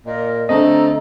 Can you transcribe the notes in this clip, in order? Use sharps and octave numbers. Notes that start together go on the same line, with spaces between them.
A#2 A#4 D#5
D3 A3 C4 A4 D#5 A#5